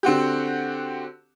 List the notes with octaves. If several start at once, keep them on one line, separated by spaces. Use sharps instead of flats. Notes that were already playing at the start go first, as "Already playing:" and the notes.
D3 C4 F#4 G4